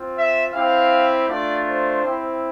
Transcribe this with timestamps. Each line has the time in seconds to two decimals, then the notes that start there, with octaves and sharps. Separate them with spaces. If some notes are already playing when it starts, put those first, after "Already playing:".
Already playing: C4 F4
0.17 E5
0.53 C4 E4 G4 F5
1.28 A3 D4 F4 D5
1.66 C5
2.02 C4 E4 G4